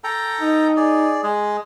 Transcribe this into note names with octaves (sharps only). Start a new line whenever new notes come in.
A4 G5 A#5
D#4
G#4 D5
G#3 G#4